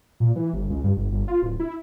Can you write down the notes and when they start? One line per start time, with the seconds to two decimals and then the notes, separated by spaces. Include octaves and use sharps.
0.20 A#2
0.36 E3
0.53 G1
0.70 C#2
0.84 G2
0.97 G1
1.12 G1
1.28 F4
1.42 D1
1.60 E4